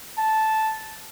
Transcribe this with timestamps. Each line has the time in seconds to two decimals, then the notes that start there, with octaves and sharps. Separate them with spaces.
0.18 A5